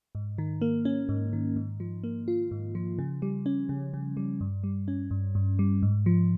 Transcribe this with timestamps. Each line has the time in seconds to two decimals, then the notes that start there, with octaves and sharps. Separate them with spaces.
0.15 G#2
0.38 D#3
0.62 A#3
0.85 C#4
1.09 G#2
1.33 D#3
1.56 G#2
1.80 F3
2.04 A#3
2.28 F4
2.51 G#2
2.75 F3
2.99 C#3
3.22 G3
3.46 C#4
3.69 C#3
3.94 C#3
4.17 G3
4.41 G2
4.64 G3
4.88 C#4
5.11 G2
5.35 G2
5.59 G3
5.82 G#2
6.06 F3